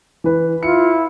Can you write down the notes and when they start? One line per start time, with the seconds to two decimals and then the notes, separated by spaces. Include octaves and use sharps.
0.24 E3 B4
0.63 E4 F4 C#7